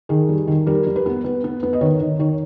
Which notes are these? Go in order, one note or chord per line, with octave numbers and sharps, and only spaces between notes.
D#3 G#4
G3
D#3
G3 A#4
G3
B4
B3
B3
B3
B3
D#5
D#3 C#5
D#3
D#3 C#5